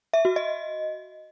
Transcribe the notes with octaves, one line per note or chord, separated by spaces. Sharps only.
E5
F#4
D#5